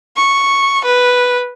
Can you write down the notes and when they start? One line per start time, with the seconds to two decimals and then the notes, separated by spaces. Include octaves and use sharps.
0.17 C#6
0.84 B4